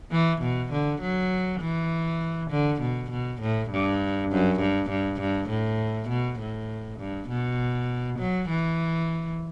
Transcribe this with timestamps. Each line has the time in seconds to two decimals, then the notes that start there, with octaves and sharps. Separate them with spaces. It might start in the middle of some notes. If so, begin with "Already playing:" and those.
0.11 E3
0.41 B2
0.72 D3
1.01 F#3
1.61 E3
2.50 D3
2.81 B2
3.11 B2
3.41 A2
3.70 G2
4.31 F#2
4.59 G2
4.89 G2
5.20 G2
5.49 A2
6.09 B2
6.39 A2
6.99 G2
7.29 B2
8.19 F#3
8.49 E3